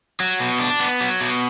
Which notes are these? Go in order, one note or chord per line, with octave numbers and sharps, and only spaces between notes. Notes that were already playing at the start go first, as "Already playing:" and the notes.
F#3
B2
D4
B3
F#3
B2